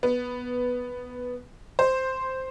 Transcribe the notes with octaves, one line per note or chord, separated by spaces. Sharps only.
B3
C5